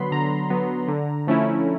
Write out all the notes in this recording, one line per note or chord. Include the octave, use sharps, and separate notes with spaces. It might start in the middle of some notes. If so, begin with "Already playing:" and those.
Already playing: D3 F#3 B3 B5 C6
D3 A#5
F#3 B3
D3
F3 A3 C#4 E4